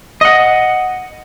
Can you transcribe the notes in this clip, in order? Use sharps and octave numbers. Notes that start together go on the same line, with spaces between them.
D#5 F#5